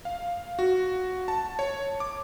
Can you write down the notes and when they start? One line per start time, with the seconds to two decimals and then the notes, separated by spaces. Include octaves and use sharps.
0.05 F5
0.59 F#4
1.28 A5
1.59 C#5
2.00 D6